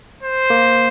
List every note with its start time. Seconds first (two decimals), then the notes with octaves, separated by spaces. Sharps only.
0.23 C5
0.50 A#3